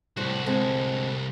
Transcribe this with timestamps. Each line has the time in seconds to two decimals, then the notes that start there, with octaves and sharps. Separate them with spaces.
0.17 C2 A2 G3 F#4 C5
0.46 D3 G#3 C4